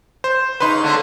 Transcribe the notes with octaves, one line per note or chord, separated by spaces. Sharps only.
C5
C#3 D#4 B4 C6
D3 A3 A#3